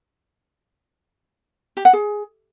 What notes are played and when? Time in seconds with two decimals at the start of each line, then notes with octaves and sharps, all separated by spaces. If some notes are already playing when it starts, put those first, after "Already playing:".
1.77 G4
1.85 F#5
1.93 G#4